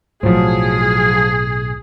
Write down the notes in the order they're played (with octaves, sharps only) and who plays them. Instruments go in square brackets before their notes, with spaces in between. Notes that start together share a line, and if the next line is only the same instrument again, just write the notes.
[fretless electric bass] B1 A2 [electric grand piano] F3 F#3 C5 [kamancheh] G#4